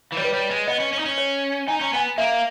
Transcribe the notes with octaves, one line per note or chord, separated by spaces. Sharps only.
E3
G3 C#5
B4
G3 C#5
G#3
B3 D#5
C#4
C#4
D#4
C#4
C#5
D#4 G#5
C#4 A#5
B3 G#5
A#3 E5